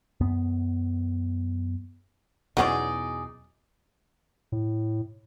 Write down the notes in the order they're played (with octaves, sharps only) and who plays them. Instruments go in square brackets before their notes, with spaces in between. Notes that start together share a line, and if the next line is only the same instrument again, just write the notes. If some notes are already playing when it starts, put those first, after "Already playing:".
[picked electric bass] F#2 B3
[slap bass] E2 B2 [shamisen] F#3 B3 C#4 [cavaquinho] D#4 G#4 D5
[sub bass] A2